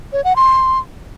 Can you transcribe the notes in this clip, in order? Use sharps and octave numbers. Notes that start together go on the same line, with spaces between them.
C#5
F#5
C6